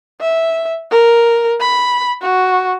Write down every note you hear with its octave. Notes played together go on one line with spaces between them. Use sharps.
E5
A#4
B5
F#4